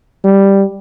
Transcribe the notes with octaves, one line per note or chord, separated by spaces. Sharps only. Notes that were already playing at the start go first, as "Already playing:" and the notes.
G3